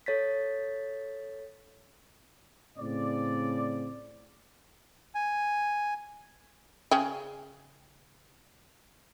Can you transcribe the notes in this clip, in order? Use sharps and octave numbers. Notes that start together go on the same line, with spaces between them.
A4 C#5 A6 B6
A2 C#3 C4 D5
G#5
C#3 G#4 G5